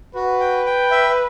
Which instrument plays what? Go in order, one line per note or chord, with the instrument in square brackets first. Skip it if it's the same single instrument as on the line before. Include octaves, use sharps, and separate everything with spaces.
[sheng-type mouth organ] F#4 [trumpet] B4
[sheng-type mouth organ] G5
G5
E5